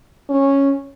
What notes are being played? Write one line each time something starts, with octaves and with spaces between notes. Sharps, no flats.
C#4